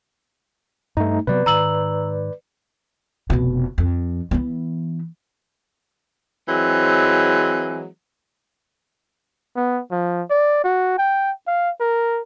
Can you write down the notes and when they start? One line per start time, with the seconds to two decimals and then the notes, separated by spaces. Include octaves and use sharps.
0.97 G2 A3 D#4
1.27 C3 F#3 B3 B4 D5
1.46 G#2 D#3 A#5 E6 F#7
3.30 F1 B2
3.78 F2
4.31 E3 B3
6.48 E3 F#3 G#3 C4
9.56 B3
9.91 F3
10.30 D5
10.64 F#4
10.98 G5
11.47 F5
11.81 A#4